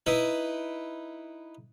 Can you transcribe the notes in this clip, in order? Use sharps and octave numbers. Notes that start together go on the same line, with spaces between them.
D#4 E4 B4